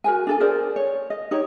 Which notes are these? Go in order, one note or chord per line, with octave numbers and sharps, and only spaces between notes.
F#4 A#4 C5 G#5
D4 A4 G#5
G#4 A#4 C5 D5
C#5
D#5
D#4 G4 C#5